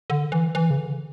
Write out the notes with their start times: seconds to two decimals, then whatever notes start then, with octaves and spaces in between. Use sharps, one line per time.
0.10 D3
0.32 E3
0.55 E3
0.70 C#3
0.77 D3
0.93 C#3